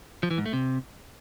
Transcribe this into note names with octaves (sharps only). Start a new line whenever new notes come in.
F3
E3
G#2
A3
C3